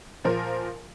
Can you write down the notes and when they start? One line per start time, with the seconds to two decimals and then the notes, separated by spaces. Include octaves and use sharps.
0.24 A#2 F3 A#4